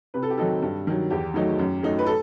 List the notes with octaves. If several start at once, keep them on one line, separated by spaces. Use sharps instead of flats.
C3 B4
A4
G4
D#3 F#3 C4 D#4 A4
G2
D#3 F#3
E2 G4
D#3 F#3 A3 D#4
F#2
F#3 A3 D#4
B4
A4